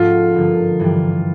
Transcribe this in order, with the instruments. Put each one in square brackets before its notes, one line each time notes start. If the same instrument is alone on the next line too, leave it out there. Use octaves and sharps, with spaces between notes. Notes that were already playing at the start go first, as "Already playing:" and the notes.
Already playing: [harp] G#2 F3 A3 C#4 F#4 [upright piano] F4
[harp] G2 D3 F3 A#3
G2 E3 G3